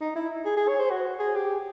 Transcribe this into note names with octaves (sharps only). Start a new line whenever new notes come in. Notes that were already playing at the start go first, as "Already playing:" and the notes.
D#4
E4
G#4
G#4
C#5
C5
F#4
G#4
G4